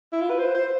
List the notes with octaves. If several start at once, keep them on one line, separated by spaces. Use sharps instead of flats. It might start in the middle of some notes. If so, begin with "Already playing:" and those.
E4
F4
B4
C5
C5